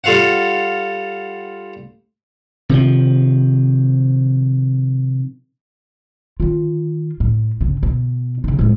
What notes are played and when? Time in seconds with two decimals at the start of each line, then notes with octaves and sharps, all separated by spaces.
0.04 G3 F4 A4 F5 F#5
2.69 C3 D#3 F3
6.40 D#3 F4
7.20 A2
7.61 G1 C#3
7.83 B2
8.44 C#3 D#4
8.59 A2 G#3